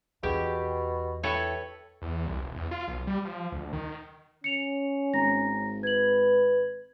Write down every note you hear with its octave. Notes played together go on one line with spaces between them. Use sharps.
E2 B2 D4 G4 G#4
E4 A4 B4 C#5 G5
E2
C2
E1
E2
F4
B1
G3
F3
D2
D#3
C#4 C#7 F7
G#1 A#5 A#6
B4 G#6 F#7